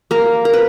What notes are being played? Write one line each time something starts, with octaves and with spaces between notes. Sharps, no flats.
A#3 A#4
A#4
B4